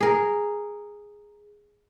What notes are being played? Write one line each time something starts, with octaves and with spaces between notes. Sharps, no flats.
G#4 A#4